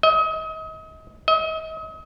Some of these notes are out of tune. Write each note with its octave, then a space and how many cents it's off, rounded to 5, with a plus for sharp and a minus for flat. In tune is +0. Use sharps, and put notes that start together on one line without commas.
D#5 +35
D#5 +40